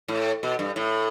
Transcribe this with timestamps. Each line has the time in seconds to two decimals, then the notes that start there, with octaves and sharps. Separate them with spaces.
0.08 A2
0.43 B2
0.59 G2
0.76 A2